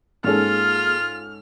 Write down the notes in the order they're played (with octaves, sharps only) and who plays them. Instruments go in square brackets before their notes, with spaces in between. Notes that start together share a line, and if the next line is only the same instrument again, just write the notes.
[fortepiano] G#2 C#4 A4 [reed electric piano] A#3 D#4 G#4 [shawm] F4 [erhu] F6